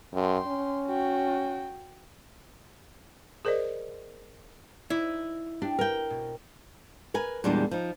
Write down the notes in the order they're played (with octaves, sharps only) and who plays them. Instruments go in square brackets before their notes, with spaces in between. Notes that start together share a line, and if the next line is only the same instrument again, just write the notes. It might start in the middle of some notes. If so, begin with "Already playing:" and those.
[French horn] F#2 [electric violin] G5 C6
[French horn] C#4
[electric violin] F#4 G5
[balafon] G#4 A#4 C5 D5 D#5
[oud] D#4 D5 [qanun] E4
[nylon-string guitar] D4 [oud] G4
[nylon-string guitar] A#4 G5
[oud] B2
[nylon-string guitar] A#4 B4 G#5
E2 A#2 G3 G#3 D4
F3 D#4